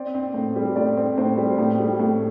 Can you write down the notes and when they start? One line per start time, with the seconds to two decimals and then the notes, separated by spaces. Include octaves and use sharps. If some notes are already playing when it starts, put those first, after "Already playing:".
Already playing: C4 D5
0.15 C4
0.34 A2
0.56 G3
0.76 A2 D5
0.97 C4
1.17 A2 C5
1.38 G3
1.58 A2
1.80 G3
2.00 A2